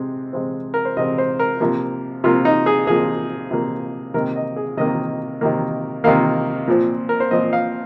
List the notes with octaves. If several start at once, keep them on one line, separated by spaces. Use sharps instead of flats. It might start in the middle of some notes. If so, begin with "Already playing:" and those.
Already playing: C3 G#3 C4
C3 G#3 C4
A#4
C5
C3 G#3 C4 D#5
C5
A#4
C3 F3 A#3
C3 F3 A#3 F4
D#4
G#4
C3 F3 A#3 G#4
C3 F3 A#3
C3 D#3 A#3 A#4
D#5
G#4
C3 D#3 A#3 D#5
C3 D#3 A#3
C3 D#3 A#3 F5
A#2 F3 C4
A#4
C5
A#2 F3 C4 D#5
F5